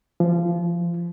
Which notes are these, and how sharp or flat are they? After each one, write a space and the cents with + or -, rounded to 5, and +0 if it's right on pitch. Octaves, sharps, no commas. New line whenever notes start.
F3 -25